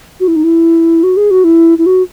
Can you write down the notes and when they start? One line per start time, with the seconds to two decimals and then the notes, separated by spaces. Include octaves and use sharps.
0.20 F#4
0.28 E4
0.36 D#4
0.44 E4
1.03 F#4
1.17 G#4
1.31 F#4
1.44 E4
1.78 E4
1.86 F#4